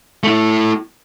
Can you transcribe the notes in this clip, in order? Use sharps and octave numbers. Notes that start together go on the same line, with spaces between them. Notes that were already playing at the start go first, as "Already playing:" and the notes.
A3 E4